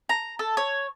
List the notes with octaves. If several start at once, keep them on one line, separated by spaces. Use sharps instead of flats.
A#5
A4
C#5